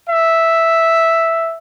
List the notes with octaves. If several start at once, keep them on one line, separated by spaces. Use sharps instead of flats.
E5